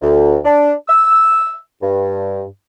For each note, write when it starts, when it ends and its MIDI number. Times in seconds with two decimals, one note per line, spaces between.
0.02 0.38 38
0.45 0.72 62
0.88 1.55 88
1.82 2.43 43